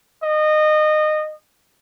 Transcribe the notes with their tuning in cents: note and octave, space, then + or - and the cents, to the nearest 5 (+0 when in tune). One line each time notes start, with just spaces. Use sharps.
D#5 -25